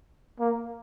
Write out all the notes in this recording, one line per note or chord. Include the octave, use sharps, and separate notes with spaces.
A#3